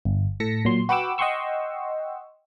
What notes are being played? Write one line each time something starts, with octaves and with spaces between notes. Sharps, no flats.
G1
A2 A4 A5 A#6 B6 C#7
A#2 F#3 C6
F#4 B4 F#5 G5 D6 E6
D#5 F#5 G5 C6 C#6 E6